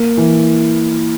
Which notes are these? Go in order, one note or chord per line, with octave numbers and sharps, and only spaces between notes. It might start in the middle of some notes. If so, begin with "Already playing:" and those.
Already playing: A#3
E3